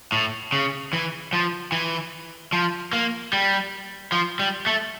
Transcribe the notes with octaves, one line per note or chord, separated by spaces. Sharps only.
A2
C#3
E3
F3
E3
F3
A#3
G3
F3
G3
A3